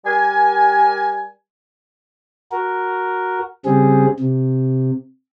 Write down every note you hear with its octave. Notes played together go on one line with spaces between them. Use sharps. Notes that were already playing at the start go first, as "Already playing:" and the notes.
G3 A#4 G#5
F#4 A#4
C#3 G3 C4 G#4
C3